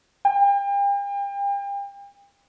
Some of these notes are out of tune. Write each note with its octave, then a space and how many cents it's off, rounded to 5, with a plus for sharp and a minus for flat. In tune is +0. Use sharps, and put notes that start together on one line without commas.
G5 +40